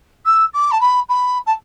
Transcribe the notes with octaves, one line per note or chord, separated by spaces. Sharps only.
E6
D6
A5
B5
B5
A5